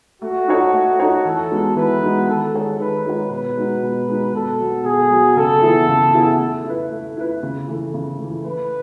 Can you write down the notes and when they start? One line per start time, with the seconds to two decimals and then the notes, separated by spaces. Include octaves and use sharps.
0.22 A3 F#4
0.48 D#4 A4 C#5
0.73 A3
1.00 D#4 A4 C#5
1.25 E3 A4
1.51 G#3 B3 D#4 F#4
1.76 E3 B4
2.03 G#3 B3 D#4 F#4
2.27 D#3 A4
2.53 G#3 D#4 G#4 C#5
2.79 D#3 B4
3.05 G#3 D#4 G#4 C#5
3.31 B2 B4
3.57 G#3 D#4 F#4
3.83 B2
4.08 G#3 D#4 F#4
4.33 B2 A4
4.59 F#3 B3 F#4
4.84 B2 G#4
5.11 F#3 B3 F#4
5.36 C#3 A4
5.62 E3 B3 E4 G#4
5.88 C#3
6.14 E3 B3 E4 G#4
6.39 A3
6.64 E4 B4
6.91 A3
7.17 E4 B4
7.43 C#3
7.68 E3 A3
7.94 C#3
8.19 E3 A3
8.44 A3 B4